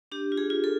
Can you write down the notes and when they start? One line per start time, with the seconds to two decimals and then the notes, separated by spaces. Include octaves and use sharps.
0.12 D4 G4
0.32 F4
0.37 G#4
0.50 F4
0.64 A4